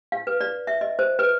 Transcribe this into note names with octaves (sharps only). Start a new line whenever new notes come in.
F5
B4
D5
E5
D#5
C5
B4